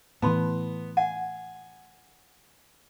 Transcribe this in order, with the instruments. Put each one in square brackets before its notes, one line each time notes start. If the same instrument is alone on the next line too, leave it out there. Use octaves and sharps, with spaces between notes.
[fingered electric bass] A2 E3 [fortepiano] B3 [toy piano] A5 B5 C6
[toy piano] F#5 [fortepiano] G#5